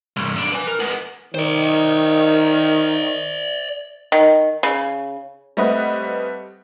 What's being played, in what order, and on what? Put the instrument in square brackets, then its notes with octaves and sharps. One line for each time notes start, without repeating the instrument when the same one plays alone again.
[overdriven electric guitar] C2 G2
B1 D4
B4 G#5
A#4
G#3 B3
[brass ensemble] D#3 [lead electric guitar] C5 D5
[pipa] D#3
C#3
[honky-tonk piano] G3 A3 C4 B4 D#5 F#5